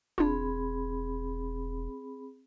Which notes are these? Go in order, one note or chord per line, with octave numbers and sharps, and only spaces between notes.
E1 C4 D4 F4 G#4 B5